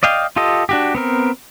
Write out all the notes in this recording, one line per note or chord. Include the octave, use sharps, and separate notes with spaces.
D5 D#5 F5 G5
F4 G4 A4 D#5
D4 F#4 G4
B3 C4 A#4